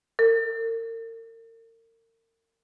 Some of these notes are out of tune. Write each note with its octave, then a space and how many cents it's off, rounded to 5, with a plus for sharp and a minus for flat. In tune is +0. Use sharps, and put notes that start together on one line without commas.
A#4 -40